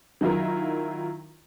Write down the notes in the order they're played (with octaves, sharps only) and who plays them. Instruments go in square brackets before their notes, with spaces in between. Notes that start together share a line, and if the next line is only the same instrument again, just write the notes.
[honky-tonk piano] D#3 F#3 E4 F4 A#4